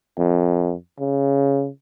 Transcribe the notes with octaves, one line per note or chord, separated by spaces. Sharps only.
F2
C#3